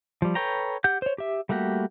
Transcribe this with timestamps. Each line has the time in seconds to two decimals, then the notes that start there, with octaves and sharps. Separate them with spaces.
0.22 F3 G3
0.35 A4 B4 C#5 G5 A#5
0.84 G4 F#5 G6
1.02 C5 C#5
1.18 G4 E5
1.49 G3 A3 A#3 F#4 G4